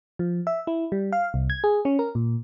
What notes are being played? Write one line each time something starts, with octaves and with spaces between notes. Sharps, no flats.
F3
E5
E4
G3
F5
C2
G#6
G#4
C#4
A#4
A#2